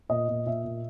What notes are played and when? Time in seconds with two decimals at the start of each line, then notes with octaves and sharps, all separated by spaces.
0.09 A#2 D#5
0.28 A#2
0.46 A#2 E5
0.64 A#2